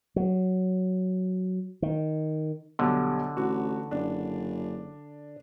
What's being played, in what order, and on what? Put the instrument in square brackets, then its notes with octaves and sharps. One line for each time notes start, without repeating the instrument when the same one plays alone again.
[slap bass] F#3
D#3
[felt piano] B1 G3 [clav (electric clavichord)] D3
[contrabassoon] A1 [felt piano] F#4
[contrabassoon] F#1 [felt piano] D4